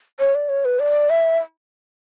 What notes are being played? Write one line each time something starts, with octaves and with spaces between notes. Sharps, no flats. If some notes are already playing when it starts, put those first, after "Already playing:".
C#5
D5
C#5
B4
D5
E5